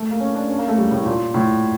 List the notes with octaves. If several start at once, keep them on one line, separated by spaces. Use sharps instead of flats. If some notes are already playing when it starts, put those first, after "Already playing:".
Already playing: A3
A#3
C#4
D4
C#4
A#3
A3
G3
A2
A#2
A2